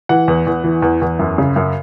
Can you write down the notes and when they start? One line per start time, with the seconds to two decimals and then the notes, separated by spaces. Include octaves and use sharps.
0.09 E3 F#5
0.28 E2
0.47 E2
0.64 E3
0.82 E2
1.02 E2
1.19 F#2
1.38 C#3
1.56 F#2